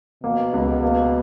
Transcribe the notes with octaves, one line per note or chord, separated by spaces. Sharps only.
B2 A#3
C#2
A#3